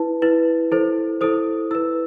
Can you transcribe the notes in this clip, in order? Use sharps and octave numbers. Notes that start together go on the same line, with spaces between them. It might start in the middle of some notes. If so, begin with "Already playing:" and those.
Already playing: E4 B4 A5
E4 B4
E4 A4 C5
E4 A4 C5 D#6
E4 B4 E6